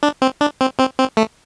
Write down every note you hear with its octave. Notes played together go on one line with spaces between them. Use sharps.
D4
C4
D4
C4
C4
C4
A3